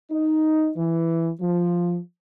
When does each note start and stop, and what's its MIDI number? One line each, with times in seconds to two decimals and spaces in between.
0.11 0.70 63
0.76 1.30 52
1.40 1.97 53